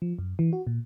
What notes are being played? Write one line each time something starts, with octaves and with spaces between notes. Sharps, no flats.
F3
F#2
E3
F#4
A#2